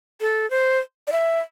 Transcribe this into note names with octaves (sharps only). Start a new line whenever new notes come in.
A4
C5
D5
E5